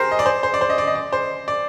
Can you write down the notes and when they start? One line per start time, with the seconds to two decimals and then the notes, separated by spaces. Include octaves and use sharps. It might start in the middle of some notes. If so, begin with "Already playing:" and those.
Already playing: G4 G#4 A#4 C5
0.11 D#5
0.19 D5
0.26 C5
0.43 C5
0.54 D5
0.61 C5
0.70 D#5
0.78 D5
0.87 D#5
0.95 D5
1.13 C5
1.48 D5